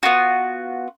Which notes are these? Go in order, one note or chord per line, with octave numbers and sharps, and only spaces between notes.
B3 F4 F#4